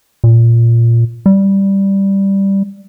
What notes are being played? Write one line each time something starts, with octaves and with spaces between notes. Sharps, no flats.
A#2
G3